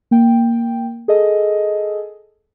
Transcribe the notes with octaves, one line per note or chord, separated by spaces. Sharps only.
A#3 G5
G#4 A4 D#5